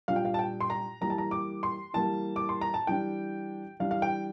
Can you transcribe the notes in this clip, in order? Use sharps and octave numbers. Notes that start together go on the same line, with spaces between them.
A#2 G3 D4 F5
G5
F5
A5
G5
C6
A#5
E3 G3 A#3 A#5
A5
A#5
D6
C6
E3 G3 A#3 A5
D6
C6
A#5
A5
E3 G3 D4 G5
E3 G3 D4 F5
F5
G5